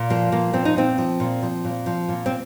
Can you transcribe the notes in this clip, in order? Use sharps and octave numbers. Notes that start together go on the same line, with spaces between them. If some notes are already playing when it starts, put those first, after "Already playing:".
Already playing: A#2
F3 A#3
A#2 A#3
F3 C4
D#4
A#2 C4
F3
A#2
F3
A#2
F3
A#2
C4